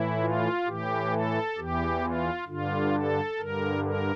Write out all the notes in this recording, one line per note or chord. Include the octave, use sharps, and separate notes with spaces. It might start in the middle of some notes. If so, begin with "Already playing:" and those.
Already playing: A2 E3 E4
F4
A2 E3 G4
A4
E2 E3 G4
F4
G2 D3 F4
A4
G2 D3 A#4
A#4